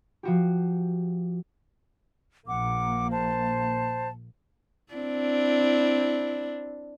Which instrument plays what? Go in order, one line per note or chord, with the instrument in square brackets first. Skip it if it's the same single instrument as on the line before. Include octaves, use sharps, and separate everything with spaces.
[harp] F3 F#4 G4
[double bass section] A#1 A#3 [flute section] F#5 D6
[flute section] C5 A5
[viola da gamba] C4 D4 E4